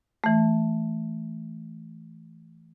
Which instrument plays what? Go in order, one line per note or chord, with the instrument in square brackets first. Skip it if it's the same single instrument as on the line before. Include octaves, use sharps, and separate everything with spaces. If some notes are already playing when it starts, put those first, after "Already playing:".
[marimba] E3 A3